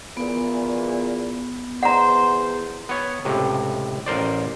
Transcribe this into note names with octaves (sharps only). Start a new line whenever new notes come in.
E2 A#2 B3
E2 C5 F#5 A#5
B3 C#5
C#2 A2 C3
A1 A#4 C5 D5